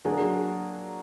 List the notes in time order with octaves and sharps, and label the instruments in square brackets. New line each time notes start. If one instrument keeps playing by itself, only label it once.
[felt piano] F#3 A#3 D4 F#4 [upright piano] G#4